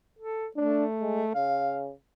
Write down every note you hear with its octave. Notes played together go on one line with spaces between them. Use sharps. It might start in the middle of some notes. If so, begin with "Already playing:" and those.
A4
A3 D4
G#3
C#3 F5